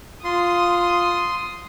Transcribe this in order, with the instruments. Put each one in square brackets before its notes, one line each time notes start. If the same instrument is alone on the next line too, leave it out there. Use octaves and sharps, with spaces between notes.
[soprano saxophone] F4 [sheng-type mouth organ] C6 [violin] D#6